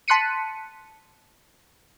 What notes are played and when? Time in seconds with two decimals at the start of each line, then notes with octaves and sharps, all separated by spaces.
0.08 A5 C6 F#6 B6 C#7 D#7